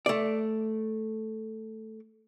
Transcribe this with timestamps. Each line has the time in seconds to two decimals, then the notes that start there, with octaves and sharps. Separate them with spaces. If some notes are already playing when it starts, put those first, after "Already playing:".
0.06 A3 D5